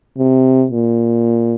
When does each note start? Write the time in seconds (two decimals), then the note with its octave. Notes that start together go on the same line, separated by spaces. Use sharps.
0.18 C3
0.71 A#2